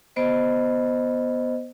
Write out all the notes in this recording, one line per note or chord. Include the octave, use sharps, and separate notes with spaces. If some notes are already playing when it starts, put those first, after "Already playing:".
B3 C5 D#5